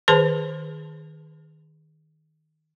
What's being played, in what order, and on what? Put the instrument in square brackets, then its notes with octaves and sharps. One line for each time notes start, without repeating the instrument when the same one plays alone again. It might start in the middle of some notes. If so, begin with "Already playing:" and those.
[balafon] D#3 G#4 B4 C5 A5 C6